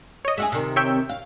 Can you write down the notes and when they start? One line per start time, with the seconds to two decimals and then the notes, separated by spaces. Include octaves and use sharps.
0.25 C#5 D#5
0.37 G#3 F#4 G#4 E5
0.52 C3 D#3
0.76 C#5 E5 G5
1.09 F5